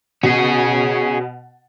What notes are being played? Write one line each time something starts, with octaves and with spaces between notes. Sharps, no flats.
B2 C#4 G#4